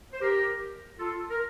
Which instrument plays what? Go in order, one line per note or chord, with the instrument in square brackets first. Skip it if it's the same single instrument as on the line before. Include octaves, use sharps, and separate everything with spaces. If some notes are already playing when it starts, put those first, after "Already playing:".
[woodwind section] C5
G4 A#4
F4 A4
A#4